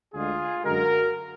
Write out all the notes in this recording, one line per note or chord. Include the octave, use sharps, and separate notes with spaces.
D2 D3 G#3 F4 G#4
F#2 D3 G#3 F#4 A#4